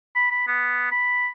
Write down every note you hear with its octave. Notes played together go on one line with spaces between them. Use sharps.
B5
B5
B3
B5